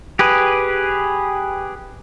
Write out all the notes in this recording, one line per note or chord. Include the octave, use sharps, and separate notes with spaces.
G4 G#4 B4